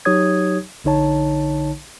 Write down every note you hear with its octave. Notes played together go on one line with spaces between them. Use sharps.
F#3 D#4 G4 C#5 D#6 G#6
A#1 D3 D#4 C#5 A5